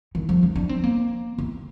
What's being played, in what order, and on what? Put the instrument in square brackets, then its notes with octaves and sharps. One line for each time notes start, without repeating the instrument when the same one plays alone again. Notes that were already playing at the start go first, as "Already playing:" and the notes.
[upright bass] D#3
F3
D4
D4
C4
A#3
C4